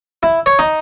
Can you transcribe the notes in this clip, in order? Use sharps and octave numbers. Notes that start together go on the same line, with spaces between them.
E4
C#5
D#4